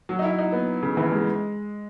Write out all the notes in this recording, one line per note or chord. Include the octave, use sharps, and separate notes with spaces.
F#3
D#4
E4
D#4
B3
C#3
E3
G#3